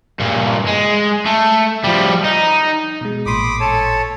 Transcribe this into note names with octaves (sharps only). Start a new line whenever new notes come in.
G2 A#2
G#3
A3
F3 G3
D#4
B2 G#3
A1 A#2 B5 C6 D6 D#6
A4 C#5 A5